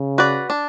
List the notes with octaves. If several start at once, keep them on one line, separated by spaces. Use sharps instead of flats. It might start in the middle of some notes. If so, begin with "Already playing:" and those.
Already playing: C#3
F#4 B4 D5
D4